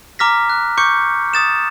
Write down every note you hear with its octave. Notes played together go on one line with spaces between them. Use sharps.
A#5 D6 F6 A#6 B6
F#6
C#6 D6 G6 C#7
D#6 A6 E7